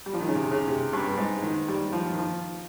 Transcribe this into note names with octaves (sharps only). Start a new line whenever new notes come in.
G3
F3
D#3
C#3
C3
C#3
C3
G2
G#2
D#3
G3
F3
D#3
F3